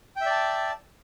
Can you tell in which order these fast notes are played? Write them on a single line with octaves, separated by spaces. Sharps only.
G5 E5 D5 A5